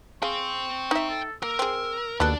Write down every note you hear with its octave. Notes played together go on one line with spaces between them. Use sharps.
G#4 F5 G5 C6 C#6
D#4 E5
A4
A#3 A#4 E6
C4 G#4
D#2 B3 D4 F#4 A4 D5